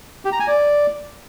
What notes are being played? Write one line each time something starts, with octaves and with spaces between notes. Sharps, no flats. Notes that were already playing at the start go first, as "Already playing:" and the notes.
G4
A#5
G#5
D5